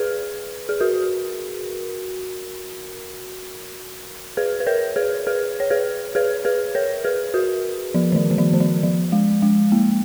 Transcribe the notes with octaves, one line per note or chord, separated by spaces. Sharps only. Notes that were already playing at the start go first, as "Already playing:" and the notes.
Already playing: G#4 B4
G#4
F#4 A#4
G#4 B4
B4
A#4 C#5
G#4 B4
G#4 B4
C#5
G#4 B4
G#4 B4
G#4 B4
A#4 C#5
G#4 B4
F#4 A#4
F3
D#3
F3
D#3
F3
D#3
F3
F3
G#3
G#3
A#3